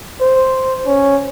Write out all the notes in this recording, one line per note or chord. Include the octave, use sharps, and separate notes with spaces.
C5
C#4